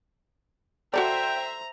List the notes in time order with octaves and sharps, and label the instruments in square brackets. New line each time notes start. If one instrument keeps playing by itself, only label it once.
[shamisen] F#4 A4 D5 [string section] C5 E5 [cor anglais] G5 [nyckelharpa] A#5